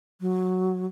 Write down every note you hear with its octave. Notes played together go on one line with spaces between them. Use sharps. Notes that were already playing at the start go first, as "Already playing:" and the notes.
F#3